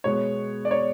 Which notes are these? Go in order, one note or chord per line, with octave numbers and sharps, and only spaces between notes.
B2 G#3 B3 C#5
D5
C#5